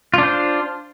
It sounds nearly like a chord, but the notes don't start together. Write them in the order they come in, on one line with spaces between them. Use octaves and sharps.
F4 D4 C5